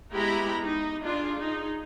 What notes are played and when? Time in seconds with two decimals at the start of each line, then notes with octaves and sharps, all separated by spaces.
0.14 G#3 B3 E4 G4 A#5 B5
0.63 D#4
1.02 D4 F4 G#4
1.38 D#4 G#4